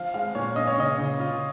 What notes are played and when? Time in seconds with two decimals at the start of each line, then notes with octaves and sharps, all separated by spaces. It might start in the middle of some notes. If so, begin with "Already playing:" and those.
Already playing: F3 F5
0.14 G#3 F5
0.35 A#2 C#5
0.56 C#4 D#5
0.67 C#5
0.78 C#3 D#5
0.98 C#3
1.20 F4